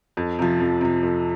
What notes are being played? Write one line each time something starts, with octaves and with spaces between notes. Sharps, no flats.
F2
C3 F3
F2
C3 F3
F2